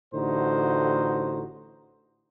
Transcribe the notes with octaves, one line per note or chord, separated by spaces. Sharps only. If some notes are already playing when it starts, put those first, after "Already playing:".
A1 A2 D3 D#4 F#4 C5